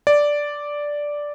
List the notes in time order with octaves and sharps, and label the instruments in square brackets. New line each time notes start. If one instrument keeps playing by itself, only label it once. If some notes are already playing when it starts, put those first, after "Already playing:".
[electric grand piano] D5